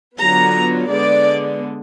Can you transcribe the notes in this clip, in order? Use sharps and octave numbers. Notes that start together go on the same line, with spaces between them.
D3 F#3 B3 F4 A#5
D3 G#3 B3 D5